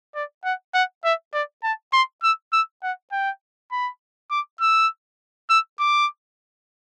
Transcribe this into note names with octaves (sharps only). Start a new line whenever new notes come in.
D5
F#5
F#5
E5
D5
A5
C6
E6
E6
F#5
G5
B5
D6
E6
E6
D6